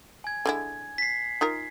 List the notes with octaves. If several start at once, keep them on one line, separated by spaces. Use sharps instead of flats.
G#5 G#6
D3 G#3 E4
B6 C7
D#4 F4 A#4